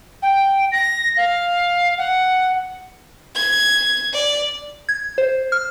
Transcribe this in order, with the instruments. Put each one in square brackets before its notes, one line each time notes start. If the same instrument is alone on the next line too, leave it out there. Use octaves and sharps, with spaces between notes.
[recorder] G5
A#6
F5
F#5
[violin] G#6
D5
[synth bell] G#6
C5
F6